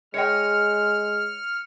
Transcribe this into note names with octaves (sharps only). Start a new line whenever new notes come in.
G#3 C#5 D#5 G5 F6 C#7